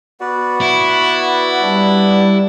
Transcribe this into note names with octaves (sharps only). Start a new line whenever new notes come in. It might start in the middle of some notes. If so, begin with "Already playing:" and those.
B3 F#4 B4 D5
E4
G3 D4